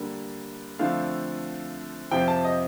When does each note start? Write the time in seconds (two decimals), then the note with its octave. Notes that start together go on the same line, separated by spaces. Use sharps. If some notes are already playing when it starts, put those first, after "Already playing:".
Already playing: D3 G3 A#3
0.79 D3 F3 A3 C4 F5
2.11 F2 C3 F3 C4 G5
2.28 A5
2.45 D#5